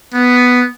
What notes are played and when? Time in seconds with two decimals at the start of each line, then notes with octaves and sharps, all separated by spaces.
0.14 B3